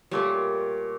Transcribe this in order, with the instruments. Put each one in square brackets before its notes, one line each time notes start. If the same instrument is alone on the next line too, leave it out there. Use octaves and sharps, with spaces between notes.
[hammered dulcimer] A#2 C#5 [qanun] G3 A3